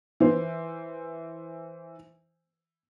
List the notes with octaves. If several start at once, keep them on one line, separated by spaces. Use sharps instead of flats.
E3 C5